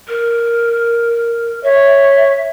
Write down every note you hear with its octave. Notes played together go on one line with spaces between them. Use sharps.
A#4
C#5 E5